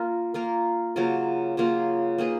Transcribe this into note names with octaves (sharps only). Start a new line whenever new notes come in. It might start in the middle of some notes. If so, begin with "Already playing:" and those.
Already playing: A#3 F4 A#4
A#3 F4 A#4
C#3 F#3 A#3 F4
C#3 F#3 A#3 F4
A#3 D#4 G#4 B4